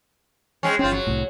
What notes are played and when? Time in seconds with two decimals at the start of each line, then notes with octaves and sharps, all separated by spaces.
0.63 G#3 C4 C#4
0.79 G1 C4 C#4 F4
0.92 F#3
1.07 C2 A2